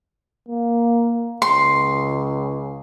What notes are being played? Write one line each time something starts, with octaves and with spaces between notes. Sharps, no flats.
A#3
C#2 C6